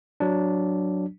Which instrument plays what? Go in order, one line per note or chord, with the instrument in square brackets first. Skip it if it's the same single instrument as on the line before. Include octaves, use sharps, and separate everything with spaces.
[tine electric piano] F#3 D4